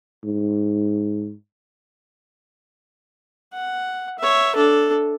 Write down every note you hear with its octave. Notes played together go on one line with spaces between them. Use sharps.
G#2
F#5
C#5 E5
D4 A4